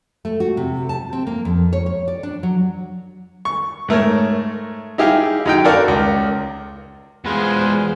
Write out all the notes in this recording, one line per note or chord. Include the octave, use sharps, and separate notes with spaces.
A3
F#4
C3
A5
C4
A#3
F2
C#5
C#5
D5
D4
F#3
C#6
G#2 A3 A#4 C#5
D#4 E4 G4 G#4 F5
F#2 D#4 G5
F#4 A4 A#4 D5 F5
C#2
E2 G#3 F4 G#4 B4 C5